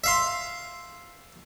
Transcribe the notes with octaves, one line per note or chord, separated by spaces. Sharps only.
E5 F5 C6